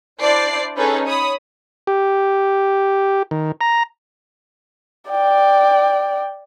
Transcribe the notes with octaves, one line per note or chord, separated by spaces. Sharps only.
D4 E4 C5 D5 C7
C#4 D#4 G#4 A4 B4
C#5 B5 D#6
G4
D#3
A#5
D5 G5